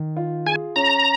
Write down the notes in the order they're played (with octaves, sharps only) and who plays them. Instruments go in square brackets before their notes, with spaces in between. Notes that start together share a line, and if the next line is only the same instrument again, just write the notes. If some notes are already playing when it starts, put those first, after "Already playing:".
Already playing: [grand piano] D#3
F4
[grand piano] G#4 [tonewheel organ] G#5
[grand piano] C#4 [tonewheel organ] A#5